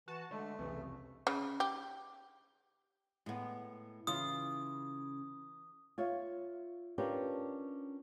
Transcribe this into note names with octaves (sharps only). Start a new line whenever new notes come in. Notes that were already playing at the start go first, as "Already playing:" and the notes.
E3 F#4 A5
D3 G#3 A3
C2 F2 C#3 E3
C#3
G4
A2 G#3 B3
C#3 E3 F4 D#6
F4 C#5 E5
C#4 D4 F4 G4 A#4 B4